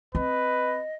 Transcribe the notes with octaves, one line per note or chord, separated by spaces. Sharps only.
C4 B4 D#5